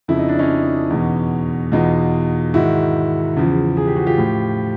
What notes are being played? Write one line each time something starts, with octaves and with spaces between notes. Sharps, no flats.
F2 C#3 F3 E4
D#4
D4
C#4 D#4
E2 B2
E2 B2 D#4 F4
G#2 D#3 E4 F#4
E2 C#3 F3
G#4
G4
F#4
F4 G4
A2 F3